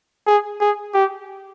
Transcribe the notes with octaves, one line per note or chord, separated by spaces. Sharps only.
G#4
G#4
G4